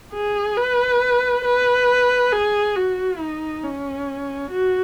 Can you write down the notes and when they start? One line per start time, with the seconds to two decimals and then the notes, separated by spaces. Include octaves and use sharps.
0.14 G#4
0.57 B4
1.44 B4
2.32 G#4
2.76 F#4
3.20 D#4
3.64 C#4
4.51 F#4